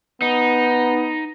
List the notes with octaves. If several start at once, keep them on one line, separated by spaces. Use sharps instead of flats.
B3 D#4